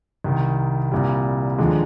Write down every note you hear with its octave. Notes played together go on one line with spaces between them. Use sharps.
C2 C3 D#3
C2 A#2 G3
D#2 D3 F3 G#3